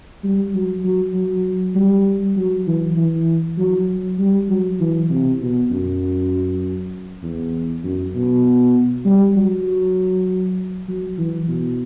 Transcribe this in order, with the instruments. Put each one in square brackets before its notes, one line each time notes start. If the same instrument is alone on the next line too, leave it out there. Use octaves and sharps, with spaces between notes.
[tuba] G3
F#3
F#3
F#3
G3
F#3
E3
E3
F#3
G3
F#3
E3
C3
B2
F#2
E2
F#2
B2
G3
F#3
F#3
E3
B2